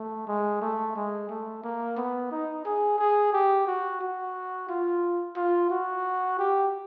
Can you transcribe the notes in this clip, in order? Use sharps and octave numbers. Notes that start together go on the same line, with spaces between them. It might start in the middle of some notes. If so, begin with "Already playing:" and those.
Already playing: A3
G#3
A3
G#3
A3
A#3
B3
D#4
G#4
G#4
G4
F#4
F#4
F4
F4
F#4
G4